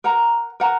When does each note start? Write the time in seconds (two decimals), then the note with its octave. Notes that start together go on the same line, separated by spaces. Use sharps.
0.04 A#4 F#5 A#5
0.60 A#4 F#5 A#5